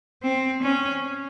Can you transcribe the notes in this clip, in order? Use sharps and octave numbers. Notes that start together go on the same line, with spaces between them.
C4
C#4